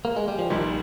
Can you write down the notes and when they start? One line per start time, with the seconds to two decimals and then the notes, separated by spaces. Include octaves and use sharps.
0.05 A#3
0.16 G#3
0.28 G3
0.39 F3
0.50 A#1 A#2 D#3 G3